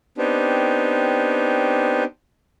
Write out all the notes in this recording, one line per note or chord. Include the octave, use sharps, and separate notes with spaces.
B3 C4 D4 D#4 G4